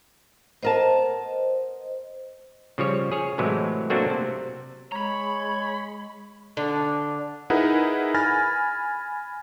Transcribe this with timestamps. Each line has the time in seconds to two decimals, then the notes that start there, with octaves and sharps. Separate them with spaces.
0.63 B3 A#4 C5 D#5 A5
2.78 C#3 F3 G3 C#5
3.11 G#4 C#5
3.38 A2 C3 E3 F#3 G#3
3.90 F#3 A3 A#3 C4 D4 F#4
4.10 C3
4.92 G#3 C#5 A#5 B5
6.57 D3 D4
7.50 D#4 E4 G#4 A#4 B4 F#5
8.15 G#5 B5 F6 A6 A#6